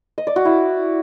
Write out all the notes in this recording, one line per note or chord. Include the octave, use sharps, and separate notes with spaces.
D#5
D5
F#4
E4